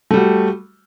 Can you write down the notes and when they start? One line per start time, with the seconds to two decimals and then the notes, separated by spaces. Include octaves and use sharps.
0.11 A3
0.14 G3
0.17 F#4